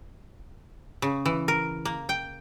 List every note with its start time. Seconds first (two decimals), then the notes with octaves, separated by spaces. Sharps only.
1.02 C#3
1.26 E3
1.48 A#4
1.85 A#3
2.09 G5